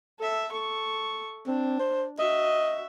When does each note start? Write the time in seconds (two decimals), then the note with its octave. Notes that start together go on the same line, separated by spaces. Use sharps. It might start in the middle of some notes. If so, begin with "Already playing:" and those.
0.19 A4 E5
0.52 A4 C#6
1.47 C4 D4
1.80 C5
2.19 F#4 D#5 E5